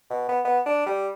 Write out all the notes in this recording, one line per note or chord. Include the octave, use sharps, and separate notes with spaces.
B2
B3
B3
D4
G3